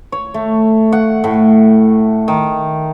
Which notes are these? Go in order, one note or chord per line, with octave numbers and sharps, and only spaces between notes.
C#5
A3
F#5
A2
D#3